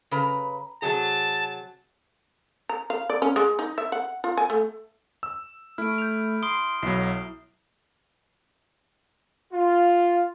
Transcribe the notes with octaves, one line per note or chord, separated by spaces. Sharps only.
C#3 B4 A#5
C3 F#3 G#4 A5
A#5
F5
D5
C#4
G#3
D#4
E5
F#5
F4
G#5
A3
E6
A3 E4 F6 D7
G6 F7
C6 D#6 D7 G7
B1 F#3 E4 C7
F4